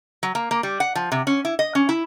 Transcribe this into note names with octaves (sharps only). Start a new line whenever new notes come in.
F#3
A#3
A#3
G3
F#5
F3
C3
C#4
E4
D#5
C#4
E4